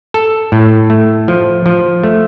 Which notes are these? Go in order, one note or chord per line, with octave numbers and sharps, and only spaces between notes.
A4
A2
A3
F3
F3
A3